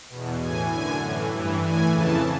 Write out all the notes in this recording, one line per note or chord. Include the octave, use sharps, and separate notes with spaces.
E2 B2
A2 E3 G#5
F#2 D3 G#5
A2 E3
G2 E3
A2 E3 G#5
F2 C#3 E3 A5